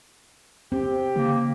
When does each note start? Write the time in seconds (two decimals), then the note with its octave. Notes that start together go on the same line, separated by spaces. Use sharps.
0.72 C4 G4
1.16 C#3 A#3